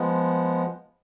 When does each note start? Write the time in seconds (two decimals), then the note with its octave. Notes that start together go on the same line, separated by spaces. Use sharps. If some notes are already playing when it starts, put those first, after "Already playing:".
Already playing: F3 G#3 B3